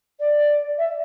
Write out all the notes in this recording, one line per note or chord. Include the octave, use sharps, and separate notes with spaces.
D5
E5